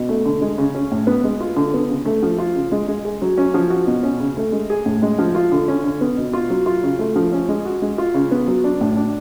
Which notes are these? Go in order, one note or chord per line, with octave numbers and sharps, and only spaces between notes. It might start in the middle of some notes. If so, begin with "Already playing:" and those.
Already playing: B2
A3
D3
G#3
C#3
C#4
A2
B3
G#3
F4
D3
B3
C#3
A3
F3
F4
C#3
G#3
G#3
G#4
F#3
C#4
F3
F#4
B2
C#4
C#3
A3
G#3
G#4
A2
G#3
F3
F4
D3
C#4
D3
B3
B2
F4
F#3
F4
C#3
A3
F3
C#4
G#3
F#4
G#3
F4
C#3
B3
F#3
D4
A2
D4